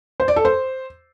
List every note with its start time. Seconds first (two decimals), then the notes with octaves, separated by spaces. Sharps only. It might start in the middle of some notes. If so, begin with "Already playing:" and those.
0.20 C5
0.28 D5
0.36 A4
0.45 C5